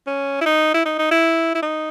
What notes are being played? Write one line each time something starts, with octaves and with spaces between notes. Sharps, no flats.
C#4
E4
D#4
E4
D#4
D#4
E4
E4
D#4